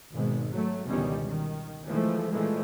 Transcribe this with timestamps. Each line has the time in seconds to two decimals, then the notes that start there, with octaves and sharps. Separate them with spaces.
0.12 G#1 G#2 B2
0.50 F#3 A3
0.87 G1 C#2 B2 D#3 G3 C#4
1.24 D#3
1.86 E3 F3 G#3 A3
2.30 A#2 E3 F3 G#3 A3